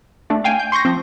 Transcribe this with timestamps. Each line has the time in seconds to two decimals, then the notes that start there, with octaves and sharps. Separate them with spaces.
0.30 A3 D4
0.44 F5 G5 G#5
0.59 G6
0.72 C6 C#6 G6 A#6
0.85 F3 C4